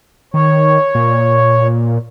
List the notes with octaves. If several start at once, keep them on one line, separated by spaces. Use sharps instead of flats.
D#3 C#5
A#2